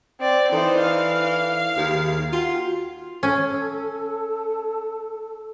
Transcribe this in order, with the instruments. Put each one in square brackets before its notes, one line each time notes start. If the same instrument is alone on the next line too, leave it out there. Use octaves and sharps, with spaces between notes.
[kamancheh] C4 D5
[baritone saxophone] E3 [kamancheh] D#4 C5 [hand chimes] A4 D5 E5
[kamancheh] F5
[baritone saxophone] D#2 [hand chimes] G#4
[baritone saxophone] F4 [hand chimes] F#4 G5 C7
[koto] C#4 [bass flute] A4